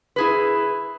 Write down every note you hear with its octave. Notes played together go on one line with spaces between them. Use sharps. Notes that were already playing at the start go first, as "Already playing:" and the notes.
E4 G#4 B4